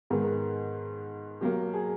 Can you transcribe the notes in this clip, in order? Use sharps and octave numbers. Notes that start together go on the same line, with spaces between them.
G#2 D#3 G#3 B3
B2 F#3 A#3 G4
G#4